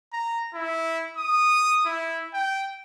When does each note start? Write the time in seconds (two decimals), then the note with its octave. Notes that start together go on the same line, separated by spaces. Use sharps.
0.13 A#5
0.54 E4
1.17 D#6
1.85 E4
2.34 G5